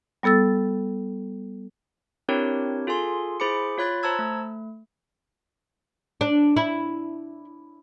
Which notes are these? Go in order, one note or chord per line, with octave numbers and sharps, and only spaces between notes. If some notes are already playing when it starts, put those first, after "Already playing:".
G3 B3 A4 E6 A6
C4 D4 E4 G4 A#4 C#5
F4 G#4 A4 G#5 C6
E4 G#4 C5 B5 D6 C#7
F4 C#5 B5 F#6 A6
C5 A5 A#5 E6 G#6
A3
D4
E4